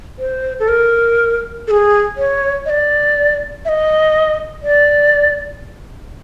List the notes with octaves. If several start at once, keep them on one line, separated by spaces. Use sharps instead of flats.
C5
A4
A#4
A4
G#4
C#5
D#5
D5
E5
D#5
D5